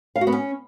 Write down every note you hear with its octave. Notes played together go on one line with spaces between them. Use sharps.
F5
F#4
B3
C#4